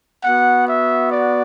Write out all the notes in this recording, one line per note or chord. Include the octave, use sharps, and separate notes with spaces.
B3 F#4 F#5
E5
D5